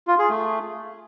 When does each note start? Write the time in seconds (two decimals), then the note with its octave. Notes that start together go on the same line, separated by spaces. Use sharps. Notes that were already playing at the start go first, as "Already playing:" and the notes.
0.07 F4
0.19 G#4
0.30 A3